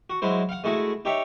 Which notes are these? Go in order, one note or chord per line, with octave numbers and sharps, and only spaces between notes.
F#4
F#3 G#3 E4 C5
F5 F#5
G#3 A3 E4 F#4 G#4
D#4 G4 C#5 E5